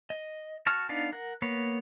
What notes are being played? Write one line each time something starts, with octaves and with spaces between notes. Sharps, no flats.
D#5
F#4 A5 C#6 F6
B3 D4 D#4 D5 F5
A#4 F#5
A#3 B3 B4 C#5